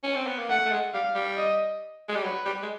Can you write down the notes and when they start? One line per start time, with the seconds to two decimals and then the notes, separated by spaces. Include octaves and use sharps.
0.04 C#4
0.15 C4
0.27 B3
0.39 A#3
0.49 A3 F#5
0.65 A3
0.71 G#3
0.94 G3 F5
1.15 G3
1.37 D#5
2.08 G#3
2.15 G3
2.24 F#3 B4
2.45 G3
2.62 G#3